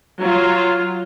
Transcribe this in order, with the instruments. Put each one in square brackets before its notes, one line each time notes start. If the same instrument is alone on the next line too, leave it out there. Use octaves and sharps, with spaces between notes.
[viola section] F#3 F4